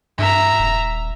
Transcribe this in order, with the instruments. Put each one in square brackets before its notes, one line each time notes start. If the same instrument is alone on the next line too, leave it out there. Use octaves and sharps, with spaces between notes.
[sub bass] G2 [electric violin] E5 A#5
[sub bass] D#1